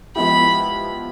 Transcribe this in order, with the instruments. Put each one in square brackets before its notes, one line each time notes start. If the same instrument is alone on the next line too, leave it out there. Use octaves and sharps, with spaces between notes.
[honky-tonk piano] F3 G#3 B3 E4 G4 [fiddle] B5